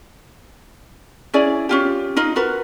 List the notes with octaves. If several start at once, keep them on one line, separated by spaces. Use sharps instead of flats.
C#4 E4 G#4 D5
C#4 F4 G4
D#4 F4 D#5
F4 F#4 A#4 B4